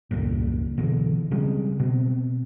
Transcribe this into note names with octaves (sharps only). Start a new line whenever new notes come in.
E1 C#2 G2 A#2
B2 D3 E3
C#3 G3 G#3 C4
B2 C4